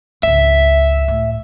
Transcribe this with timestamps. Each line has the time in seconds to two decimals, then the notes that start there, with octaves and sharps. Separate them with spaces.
0.23 G#1 C#2 E5
1.08 A2